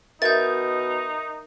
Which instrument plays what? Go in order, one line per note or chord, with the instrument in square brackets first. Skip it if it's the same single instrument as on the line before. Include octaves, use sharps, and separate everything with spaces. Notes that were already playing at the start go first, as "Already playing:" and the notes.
[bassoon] B2 [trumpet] D#4 [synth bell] A#4 E5 [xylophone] G6 A6